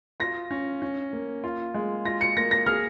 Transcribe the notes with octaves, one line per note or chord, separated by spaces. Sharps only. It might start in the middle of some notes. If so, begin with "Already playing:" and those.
F4 A#6
C#4
C#4
A#3
F4
G#3
F4 A#6
C#7
A#3 A#6
A#6
G#4 F6